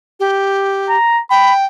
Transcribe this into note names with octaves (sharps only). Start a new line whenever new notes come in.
G4
A#5
G5 B5